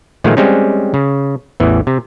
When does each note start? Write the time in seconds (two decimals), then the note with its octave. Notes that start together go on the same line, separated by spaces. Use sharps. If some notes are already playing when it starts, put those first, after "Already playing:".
0.24 A#2 D#3 F3 G#3 A3
0.37 G3 G#3 C4 C#4
0.94 C#3
1.60 A1 E2 E3
1.87 C3